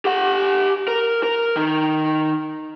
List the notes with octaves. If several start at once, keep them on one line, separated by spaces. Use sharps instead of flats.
G4 F#5
A#4
A#4
D#3 D#4